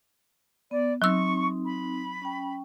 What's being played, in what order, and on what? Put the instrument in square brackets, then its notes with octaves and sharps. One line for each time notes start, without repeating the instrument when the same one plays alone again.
[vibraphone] B3 [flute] D5
[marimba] F#3 E6 [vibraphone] C4 D#4 [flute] C#6
[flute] B5
[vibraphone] C#4 G5